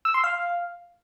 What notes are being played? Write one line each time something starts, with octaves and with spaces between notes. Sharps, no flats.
E6
C6
F5